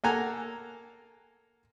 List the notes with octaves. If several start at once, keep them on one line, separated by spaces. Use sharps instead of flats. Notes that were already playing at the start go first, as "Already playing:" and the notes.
A#3 A4 F#5 G#5 A#5